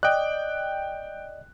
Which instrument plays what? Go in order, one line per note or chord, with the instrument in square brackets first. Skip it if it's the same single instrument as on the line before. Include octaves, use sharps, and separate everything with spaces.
[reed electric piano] D5 D#5 [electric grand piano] G5 F#6